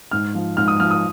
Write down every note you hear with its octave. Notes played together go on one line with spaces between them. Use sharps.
G#2 F6
F3
G#2 F6
D#6
F3 F6
D#6